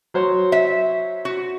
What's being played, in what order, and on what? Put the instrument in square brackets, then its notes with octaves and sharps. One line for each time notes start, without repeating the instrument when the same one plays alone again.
[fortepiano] F#3 C5 C#5
[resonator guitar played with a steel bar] E5
F#4